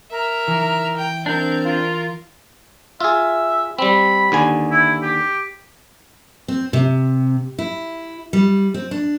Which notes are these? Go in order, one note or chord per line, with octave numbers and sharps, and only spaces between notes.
A#4 E5
E3
G5
C4 D4 A#4 G6
F4
F4 G#4 E5
G3 C4 B5
D#2 D3 G#5
E4
G4
C4
C3
E4
G3
C4
D4